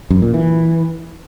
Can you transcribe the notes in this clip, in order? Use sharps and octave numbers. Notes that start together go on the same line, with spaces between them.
F#2
A#2
E3